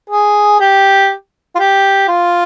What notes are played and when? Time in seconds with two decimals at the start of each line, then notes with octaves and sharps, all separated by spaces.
0.10 G#4
0.60 G4
1.55 F4
1.59 G4
2.08 F4